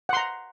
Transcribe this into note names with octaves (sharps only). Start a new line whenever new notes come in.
F#5 A#5 C6